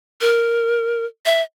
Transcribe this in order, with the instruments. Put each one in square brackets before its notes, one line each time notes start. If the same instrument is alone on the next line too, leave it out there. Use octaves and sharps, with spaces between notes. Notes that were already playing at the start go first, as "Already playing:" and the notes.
[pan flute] A#4
E5